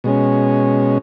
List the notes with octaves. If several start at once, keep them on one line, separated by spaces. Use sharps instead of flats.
B2 G#3 C#4